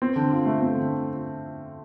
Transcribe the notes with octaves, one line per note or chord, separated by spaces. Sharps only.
C4
D3
F4
A3
C4
D3